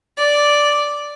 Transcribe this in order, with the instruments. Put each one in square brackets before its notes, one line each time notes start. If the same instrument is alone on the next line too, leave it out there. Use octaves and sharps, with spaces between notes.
[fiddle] D5